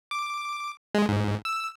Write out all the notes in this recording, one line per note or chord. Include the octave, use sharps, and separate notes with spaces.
D6
G#3
G#2
E6